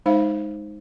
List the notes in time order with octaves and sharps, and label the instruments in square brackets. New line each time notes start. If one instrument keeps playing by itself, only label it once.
[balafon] G#3 D#4 C5 F5